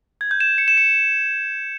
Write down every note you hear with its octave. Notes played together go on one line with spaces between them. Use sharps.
G#6
G6
E7
C#7
E7
C#7